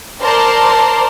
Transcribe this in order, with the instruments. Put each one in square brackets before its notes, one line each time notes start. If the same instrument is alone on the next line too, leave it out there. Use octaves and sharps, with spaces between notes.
[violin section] A#4 C5 D5 A5 C6